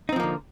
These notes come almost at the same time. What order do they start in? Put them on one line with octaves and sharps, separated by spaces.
D#4 C4 F3 A#3 D3